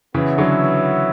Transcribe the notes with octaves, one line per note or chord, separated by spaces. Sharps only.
C#3 E3 B3 F#4 C#5 E5
D3 F#3